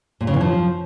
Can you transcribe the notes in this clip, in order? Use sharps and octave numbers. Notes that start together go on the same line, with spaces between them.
A#2
C#3
E3
F3